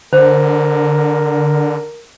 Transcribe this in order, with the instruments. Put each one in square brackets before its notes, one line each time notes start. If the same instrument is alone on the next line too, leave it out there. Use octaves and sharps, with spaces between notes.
[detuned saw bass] D3 [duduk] A#4 [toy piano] C5